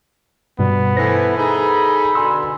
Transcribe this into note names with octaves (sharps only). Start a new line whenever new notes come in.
G2 B2 G3 B3
E3 A3 C5 A#6 B6
D#4 G#4 A4 B5
B2 D3 G#5 C6 E6